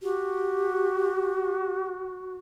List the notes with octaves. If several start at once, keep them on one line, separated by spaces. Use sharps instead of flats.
F#4 G4